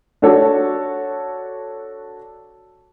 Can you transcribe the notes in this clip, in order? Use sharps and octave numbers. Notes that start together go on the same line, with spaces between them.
D4 F#4 A4 C#5